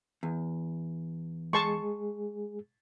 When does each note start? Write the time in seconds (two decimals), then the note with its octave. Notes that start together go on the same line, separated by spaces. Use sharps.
0.23 E2
1.53 G#3 G#4 A5 C6 C#6